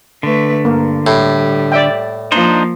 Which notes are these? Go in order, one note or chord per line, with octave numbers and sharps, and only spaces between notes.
D3 A3 B4
G2 A#3
A2 G3
D5 E5 G5
F3 A#3 D4 D#4 C5